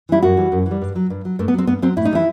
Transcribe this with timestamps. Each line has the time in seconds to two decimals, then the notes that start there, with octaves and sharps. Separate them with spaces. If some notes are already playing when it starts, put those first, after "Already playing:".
0.09 E3 G3 E4
0.22 F#2 F#4
0.37 E3 G3
0.52 F#2
0.66 E3
0.71 G3
0.82 G2
0.96 F#3
1.10 G2
1.25 F#3
1.39 G2 A3
1.48 B3
1.54 F#3 C4
1.67 G2 B3
1.82 F#3 C4
1.97 A2 E4
2.05 D#4
2.11 E3 G3 E4